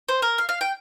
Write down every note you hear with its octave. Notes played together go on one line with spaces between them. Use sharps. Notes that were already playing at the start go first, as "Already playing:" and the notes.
C5
A#4
F5
F5
G5